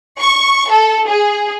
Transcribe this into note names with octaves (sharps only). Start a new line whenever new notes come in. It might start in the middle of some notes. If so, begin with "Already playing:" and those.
C#6
A4
G#4